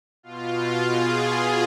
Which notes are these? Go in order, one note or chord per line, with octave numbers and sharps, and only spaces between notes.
B2 F4
G#4